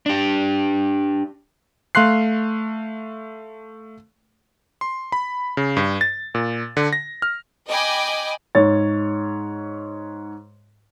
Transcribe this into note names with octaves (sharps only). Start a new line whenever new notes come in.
D4 G4
A3 F5 C6 F#6 C7
C6
B5
C#3
G2
A6
A#2
D3
A#6
F6
D#5 G5 G#5 B5 D6
G#2 C#5 A6